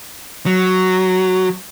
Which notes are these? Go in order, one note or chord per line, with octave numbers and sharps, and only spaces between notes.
F#3